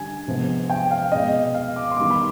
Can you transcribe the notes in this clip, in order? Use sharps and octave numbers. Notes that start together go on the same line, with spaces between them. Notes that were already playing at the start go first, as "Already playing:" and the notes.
Already playing: D3 G3 G#5
C3 F3 G#3 B3
G5
F5
B2 G#3 C4 D#5
F5
D6
C6
D#3 G3 B3 D6
B5